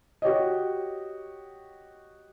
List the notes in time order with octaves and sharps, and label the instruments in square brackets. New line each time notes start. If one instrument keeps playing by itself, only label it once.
[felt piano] F#4 G4 C#5 D#5